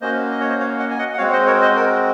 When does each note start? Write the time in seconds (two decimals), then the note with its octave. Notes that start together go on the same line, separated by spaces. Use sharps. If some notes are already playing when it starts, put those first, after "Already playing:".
0.01 A#3 C#4 F#4 C5 D#5
0.31 D#5
0.40 C#5
0.49 C5 D#5
0.60 C#5 F5
0.79 D#5 F#5
0.90 G#5
0.98 D#5 F#5
1.13 F#5
1.17 G#3 C4 F#4 C#5 F5
1.32 C5 D#5
1.47 A#4 C#5
1.62 C5 D#5
1.76 A#4